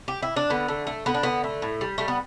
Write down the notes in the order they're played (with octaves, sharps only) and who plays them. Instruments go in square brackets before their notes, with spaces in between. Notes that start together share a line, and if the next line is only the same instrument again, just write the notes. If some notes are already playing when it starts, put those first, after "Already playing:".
[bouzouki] G4
E4
D4
D3 B3
A3
A3
D3 B3
D4
D3 B3
A3
A2
G3
G3 A3
B3